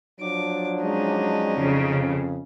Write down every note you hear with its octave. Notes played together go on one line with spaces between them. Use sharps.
F3 F#3 D4 D6
G#3 C#4 D#4
F2 C#3